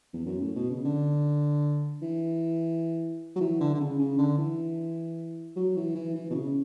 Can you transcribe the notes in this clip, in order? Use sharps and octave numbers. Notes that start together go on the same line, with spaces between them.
E2
F#2
A2
B2
C#3
D3
E3
F#3
E3
D3
D3
C#3
C#3
D3
E3
F#3
E3
E3
E3
B2
C#3